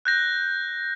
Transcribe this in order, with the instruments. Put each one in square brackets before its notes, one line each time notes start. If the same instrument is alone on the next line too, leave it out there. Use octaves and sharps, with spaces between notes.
[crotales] F#6 G6 A#6